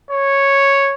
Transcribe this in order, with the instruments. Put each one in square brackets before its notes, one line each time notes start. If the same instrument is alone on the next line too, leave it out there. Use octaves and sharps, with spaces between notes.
[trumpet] C#5